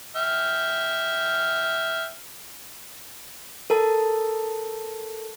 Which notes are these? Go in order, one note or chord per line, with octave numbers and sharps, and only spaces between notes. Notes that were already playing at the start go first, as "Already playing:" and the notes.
E5 G5 F6
A4 A#4 A5